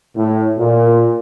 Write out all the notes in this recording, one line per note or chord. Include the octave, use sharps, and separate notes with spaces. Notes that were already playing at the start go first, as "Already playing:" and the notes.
A2
A#2